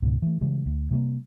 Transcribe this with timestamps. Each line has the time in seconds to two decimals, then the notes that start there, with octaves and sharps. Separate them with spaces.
0.02 C#2 G#2 B2
0.22 E3 A3
0.41 C#3 E3 G3 G#3
0.66 D2
0.91 C3 G3 A3 A#3